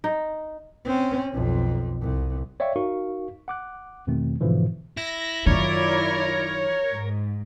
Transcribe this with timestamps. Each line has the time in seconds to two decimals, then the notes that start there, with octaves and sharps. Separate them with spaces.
0.04 D#4
0.85 C4 C#4
1.33 B1 F2
2.01 C2
2.60 C#5 D5 E5 F5 G5 C#6
2.76 D#4 F#4 A#4 F5 C#6
3.48 F#5 D6 F#6
4.07 E2 B2 D#3 A3 C4
4.41 G#2 B2 D3 E3 F3
4.97 E4 A#6
5.47 F#2 D#3 E4 F4 A#4 C#5 D5
6.91 G#2